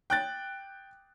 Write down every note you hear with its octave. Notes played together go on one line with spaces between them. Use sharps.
G5 F#6 A6